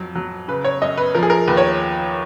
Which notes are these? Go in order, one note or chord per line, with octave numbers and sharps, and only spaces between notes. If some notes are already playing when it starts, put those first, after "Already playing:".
Already playing: F2 F#3
F#3
C#3 B4
C#5
F#2 D#5
B4
F3 A#4
G#4
A#4
D#2 B4
C#5